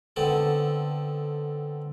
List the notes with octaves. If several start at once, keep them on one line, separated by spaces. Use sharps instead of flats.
D3 B3 C4 A4